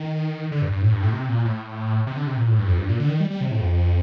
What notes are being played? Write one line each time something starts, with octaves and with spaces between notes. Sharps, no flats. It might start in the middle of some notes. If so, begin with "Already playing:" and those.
Already playing: D#3
D3
G2
G2
A2
G2
A2
C3
A#2
A2
C3
D3
C3
A#2
A2
G2
F2
G2
A#2
D3
D#3
G3
G3
C3
A2
F2